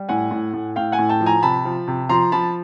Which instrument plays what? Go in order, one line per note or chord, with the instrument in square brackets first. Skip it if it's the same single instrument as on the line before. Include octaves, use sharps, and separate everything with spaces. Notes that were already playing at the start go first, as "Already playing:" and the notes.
Already playing: [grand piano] G3
A2 F#5 G#5
A2
A2
A2 F5 G5
F#5 G#5
A2
G5 A5
F3
G#5 A#5
C3 A5 B5
F3
C3
F3 A#5 C6
F3 A5 B5